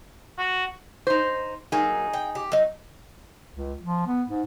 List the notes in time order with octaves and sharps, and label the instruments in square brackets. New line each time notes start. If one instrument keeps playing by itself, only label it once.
[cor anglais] F#4
[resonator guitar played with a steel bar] D#4 C5
[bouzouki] F#3 A#3 [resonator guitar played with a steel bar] D#4 G#4
[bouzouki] G5
G4
F#3 D#4
[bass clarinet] C#2
F3
B3
G#2